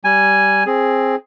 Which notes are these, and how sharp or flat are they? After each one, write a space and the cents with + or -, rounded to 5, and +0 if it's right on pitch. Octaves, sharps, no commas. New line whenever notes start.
G3 -10 G#5 +0
C4 +15 G#4 +5